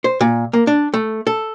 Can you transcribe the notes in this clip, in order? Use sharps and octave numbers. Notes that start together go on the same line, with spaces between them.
C5
A#2
A#3
D4
A3
A4